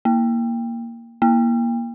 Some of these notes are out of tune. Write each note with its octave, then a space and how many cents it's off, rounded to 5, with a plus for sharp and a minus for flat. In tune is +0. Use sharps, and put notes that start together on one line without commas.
A#3 +0
A#3 +15